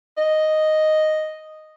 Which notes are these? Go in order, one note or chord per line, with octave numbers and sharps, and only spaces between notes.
D#5